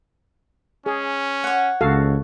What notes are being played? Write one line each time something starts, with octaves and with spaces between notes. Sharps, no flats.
C#4 G#4
C#5 F#5
C#2 F#4 A4 F5